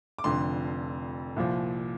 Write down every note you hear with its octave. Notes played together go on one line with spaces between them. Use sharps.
D6
F1 F2 D3 C6
C2 A#2 F3